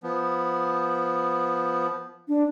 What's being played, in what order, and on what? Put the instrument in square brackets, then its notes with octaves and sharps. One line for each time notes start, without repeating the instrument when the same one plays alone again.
[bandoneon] F3 B3
[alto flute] D4